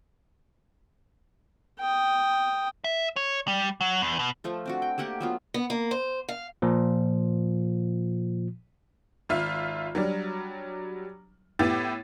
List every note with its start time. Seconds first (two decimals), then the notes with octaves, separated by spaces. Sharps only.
1.80 G5 D#6
2.84 E5
3.16 C#5
3.48 G3
3.81 F#3
4.02 E2
4.19 B2
4.44 F3 A3 F4
4.66 C4 D4 F#4
4.82 G5
4.98 A3 A#3 G4 F#5
5.21 F#3 B3 F4
5.54 B3
5.70 A#3
5.91 C5
6.29 F5
6.62 A#2 F3
9.29 G#1 F4 E5 F6
9.95 F#3 G3 D4
11.59 A2 B3 E4 G4 D6 A6